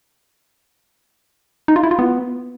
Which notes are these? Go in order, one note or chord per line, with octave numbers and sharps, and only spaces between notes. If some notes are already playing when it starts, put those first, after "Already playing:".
D#4
F4
E4
F4
B3